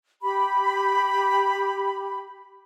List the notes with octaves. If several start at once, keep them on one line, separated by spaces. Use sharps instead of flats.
G4 B5